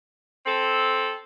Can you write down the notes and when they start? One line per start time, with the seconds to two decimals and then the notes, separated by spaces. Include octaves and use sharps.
0.46 C4 A4